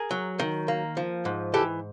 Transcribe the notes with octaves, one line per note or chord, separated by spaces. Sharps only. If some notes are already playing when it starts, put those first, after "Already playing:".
Already playing: G#4 A#4
F#3
D#3
A#3
F3
G#2
E3 G4 A4